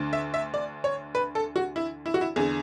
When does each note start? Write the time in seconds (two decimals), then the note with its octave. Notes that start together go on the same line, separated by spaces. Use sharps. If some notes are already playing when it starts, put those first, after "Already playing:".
Already playing: D2 D3
0.13 E5
0.34 E5
0.54 D5
0.84 C#5
1.15 B4
1.35 A4
1.56 F#4
1.76 E4
2.06 E4
2.14 F#4
2.21 E4
2.36 E2 D3 G#4